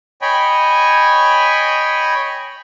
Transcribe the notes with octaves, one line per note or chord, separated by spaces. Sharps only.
C#5 D#5 G5 G#5 B5